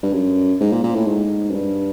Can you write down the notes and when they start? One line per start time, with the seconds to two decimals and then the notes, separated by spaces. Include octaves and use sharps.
0.03 G2
0.13 F#2
0.60 G#2
0.72 A#2
0.83 A#2
0.95 A2
1.07 G#2
1.50 F#2
1.54 G2